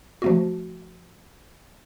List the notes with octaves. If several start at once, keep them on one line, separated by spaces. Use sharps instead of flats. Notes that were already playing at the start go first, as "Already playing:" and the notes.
F3 A3 F#4